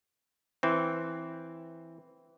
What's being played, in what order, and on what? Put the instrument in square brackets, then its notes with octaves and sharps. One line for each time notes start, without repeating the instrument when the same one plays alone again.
[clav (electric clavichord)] E3 C4